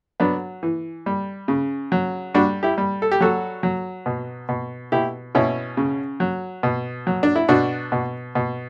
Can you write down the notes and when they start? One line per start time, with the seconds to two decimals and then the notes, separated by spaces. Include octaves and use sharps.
0.20 F#3 B3 D4
0.63 E3
1.06 G3
1.48 C#3
1.92 F#3
2.34 G3 D4 F#4
2.63 E4 G4
2.78 G3
3.02 A4
3.12 G4
3.21 F#3 F#4 A4
3.63 F#3
4.06 B2
4.49 B2
4.92 B2 E4 G4
5.35 B2 C#4 E4
5.77 C#3
6.20 F#3
6.63 B2
7.07 F#3
7.23 D4
7.36 E4
7.49 B2 D4 F#4
7.92 B2
8.35 B2